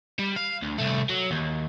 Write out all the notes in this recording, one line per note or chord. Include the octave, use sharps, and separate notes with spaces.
G3
F5
D2
C2 A3
F#3
D#2